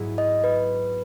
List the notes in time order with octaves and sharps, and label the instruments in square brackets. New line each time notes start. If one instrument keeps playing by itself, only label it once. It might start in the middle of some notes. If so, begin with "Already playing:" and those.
Already playing: [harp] G#2 F#3 B3 E4 G#4
[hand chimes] D#5
B4